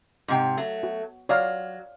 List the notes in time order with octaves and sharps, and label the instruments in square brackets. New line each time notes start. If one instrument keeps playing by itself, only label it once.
[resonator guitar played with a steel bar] G#2 C3 G5
F#3 A3
[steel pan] F#4
[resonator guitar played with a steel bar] F#3 [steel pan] C#5 D5 F5